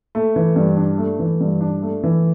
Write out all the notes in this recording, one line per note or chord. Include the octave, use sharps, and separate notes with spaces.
A3
E3
G2
D4
A3
E3
G2
D4
A3
E3